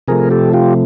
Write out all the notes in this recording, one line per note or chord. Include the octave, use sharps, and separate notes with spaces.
C3 F3 A3 G#4 A#4
G4 A4
F4 G4